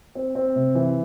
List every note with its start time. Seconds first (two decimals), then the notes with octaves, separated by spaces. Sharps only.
0.15 C4
0.35 C4
0.55 C3
0.75 E3